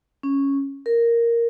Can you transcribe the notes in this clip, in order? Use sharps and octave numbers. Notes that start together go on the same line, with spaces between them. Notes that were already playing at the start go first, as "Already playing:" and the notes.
C#4
A#4